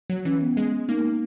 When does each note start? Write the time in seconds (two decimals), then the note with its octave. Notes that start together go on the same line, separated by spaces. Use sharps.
0.10 F#3
0.25 E3 C#4
0.41 B3
0.57 G#3
0.88 A#3 D#4